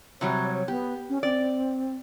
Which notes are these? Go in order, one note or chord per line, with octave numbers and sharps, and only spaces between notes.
C3 F#3 G3 C#5
B3 G4
C#4
C4 D5